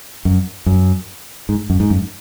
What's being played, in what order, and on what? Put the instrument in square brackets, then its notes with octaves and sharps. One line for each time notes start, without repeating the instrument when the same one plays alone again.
[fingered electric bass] F#2
F#2
G#2
F#2
G#2
F#2